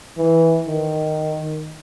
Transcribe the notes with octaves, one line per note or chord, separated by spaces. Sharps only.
E3
D#3